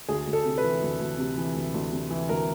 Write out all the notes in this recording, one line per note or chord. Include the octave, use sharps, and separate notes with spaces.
D2 G#4
D2
A4
C3
B4
E3
D2
D2
C3
E3
D2
D2
C3
E3
D2 A#4